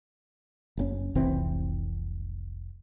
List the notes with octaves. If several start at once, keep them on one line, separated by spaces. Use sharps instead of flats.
F#1 C3 C#4
F1 C2 E3 C4